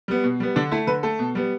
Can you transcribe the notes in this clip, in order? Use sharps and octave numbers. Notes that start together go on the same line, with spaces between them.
G3 B3
B2
G3 B3
D3 D4
A3 E4
D3 B4
A3 A4
B2
G3 B3